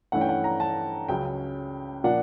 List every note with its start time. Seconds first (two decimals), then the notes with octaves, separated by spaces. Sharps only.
0.12 G2 E3 A3 C#4 E4 F#5
0.21 G5
0.29 F#5
0.44 A#5
0.60 A5
1.08 C#2 C#3 F#3 G5
2.04 A#2 F3 A#3 D4 F#5